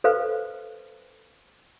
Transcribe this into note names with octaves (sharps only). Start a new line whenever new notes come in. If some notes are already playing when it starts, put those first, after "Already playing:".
A4 B4 C5 F5